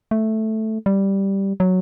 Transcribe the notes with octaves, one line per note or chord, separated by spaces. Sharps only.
A3
G3
F#3